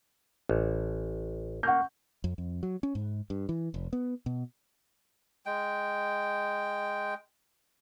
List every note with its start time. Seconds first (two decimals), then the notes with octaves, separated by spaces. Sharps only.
0.49 A1
1.63 A#3 F#5 C#6 G6
2.24 F2
2.38 F2
2.63 F#3
2.83 C#4
2.95 G#2
3.30 G2
3.49 E3
3.74 F1
3.93 B3
4.26 B2
5.46 G#3 G5